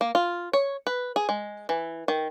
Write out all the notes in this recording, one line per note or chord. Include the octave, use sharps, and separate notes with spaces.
A#3
F4
C#5
B4
G#4
G#3
E3
D#3